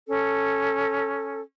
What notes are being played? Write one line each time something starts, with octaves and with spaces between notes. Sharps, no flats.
C#4 A4